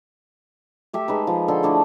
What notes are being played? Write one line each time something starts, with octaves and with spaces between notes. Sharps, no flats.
A3 G4 E5
G#3 D#4 B4
F3
D3 A4 C6
A3 D4 E4 D#5